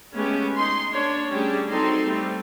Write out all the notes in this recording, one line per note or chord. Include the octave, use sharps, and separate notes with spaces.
G#3 A3 B3 C#4 G4
D#4 C6
A#3 D4 C#5
G3 A3 C#4 D4 G4 G#4
F#3 C4 D#4 A4 C6
G3 A3 C4